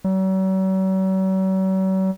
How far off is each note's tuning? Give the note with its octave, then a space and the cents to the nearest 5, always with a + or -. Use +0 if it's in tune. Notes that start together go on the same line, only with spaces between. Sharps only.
F#3 +45